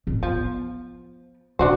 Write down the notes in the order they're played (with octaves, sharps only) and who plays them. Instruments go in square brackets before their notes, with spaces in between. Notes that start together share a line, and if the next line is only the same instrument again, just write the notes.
[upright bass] A1
[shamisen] F3 [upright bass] B3
[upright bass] E1 [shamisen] D4 F#4 C5